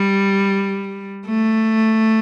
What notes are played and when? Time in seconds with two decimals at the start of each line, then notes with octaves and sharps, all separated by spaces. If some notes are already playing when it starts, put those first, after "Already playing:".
Already playing: G3
1.26 A3